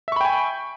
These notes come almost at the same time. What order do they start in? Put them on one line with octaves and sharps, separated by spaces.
E5 C#6 B5 G5 G#5